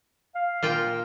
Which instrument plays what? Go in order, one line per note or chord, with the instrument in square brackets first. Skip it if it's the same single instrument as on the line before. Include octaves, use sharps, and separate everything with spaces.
[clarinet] F5
[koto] A#2 F4 G5